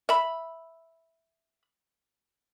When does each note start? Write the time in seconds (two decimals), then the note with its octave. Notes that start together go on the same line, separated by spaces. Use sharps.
0.09 E5 B5